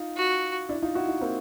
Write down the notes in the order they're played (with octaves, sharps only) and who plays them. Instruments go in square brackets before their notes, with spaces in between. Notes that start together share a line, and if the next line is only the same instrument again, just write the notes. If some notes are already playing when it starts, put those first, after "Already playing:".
Already playing: [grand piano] D#4 F4
[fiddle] F#4
[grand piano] D4 E4
D#4 F4
E4 F#4
D#4 F4
A#3 C4